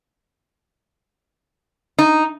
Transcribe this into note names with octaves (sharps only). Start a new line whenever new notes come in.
D#4